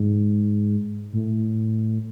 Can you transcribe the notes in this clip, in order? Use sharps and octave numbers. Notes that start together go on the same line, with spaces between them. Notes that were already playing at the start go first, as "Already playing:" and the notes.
Already playing: G#2
A2